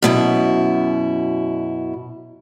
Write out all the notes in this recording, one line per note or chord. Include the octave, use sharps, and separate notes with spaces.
F#2 B2 E4